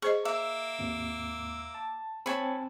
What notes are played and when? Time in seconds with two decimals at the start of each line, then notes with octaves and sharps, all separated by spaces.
0.02 G#4 C5 D#5 C#6
0.25 A#3 E5 D6 E6
0.79 G#1 D#2
1.75 A5
2.26 C4 C#5 G#5 A5 B5